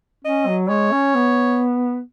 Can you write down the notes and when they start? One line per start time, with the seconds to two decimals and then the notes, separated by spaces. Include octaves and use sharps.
0.25 C#4 D#5
0.47 F#3
0.69 G#3 C#5
0.92 C#4
1.15 B3